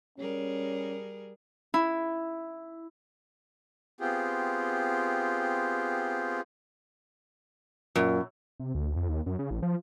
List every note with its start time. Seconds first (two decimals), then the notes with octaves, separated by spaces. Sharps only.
0.18 G3 C#4 G#4 A#4
1.74 E4
4.00 B3 C4 F4 G4 G#4
7.96 F#2 A#2
8.60 C3
8.75 D2
8.96 F2
9.09 D#2
9.26 F#2
9.39 C#3
9.51 A1
9.62 F3